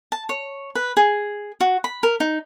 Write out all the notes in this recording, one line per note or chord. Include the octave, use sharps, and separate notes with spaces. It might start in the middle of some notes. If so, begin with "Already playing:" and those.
A5
C#5
B4
G#4
F#4
B5
A#4
D#4